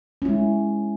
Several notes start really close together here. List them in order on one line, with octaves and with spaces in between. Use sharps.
C#4 E4 G#3